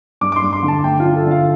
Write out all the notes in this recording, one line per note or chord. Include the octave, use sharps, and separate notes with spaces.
G2 D6
D6
C6
G2
C6
D3
A5
A3 G5
D3 F4
A4
D3
F5